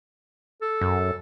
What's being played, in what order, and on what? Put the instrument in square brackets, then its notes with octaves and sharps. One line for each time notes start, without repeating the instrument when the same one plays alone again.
[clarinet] A4
[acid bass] F#2